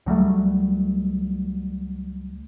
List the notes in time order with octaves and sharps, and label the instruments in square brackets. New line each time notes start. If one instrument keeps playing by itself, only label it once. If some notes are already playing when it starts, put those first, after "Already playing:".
[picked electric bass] C#2 F#3 G3 A3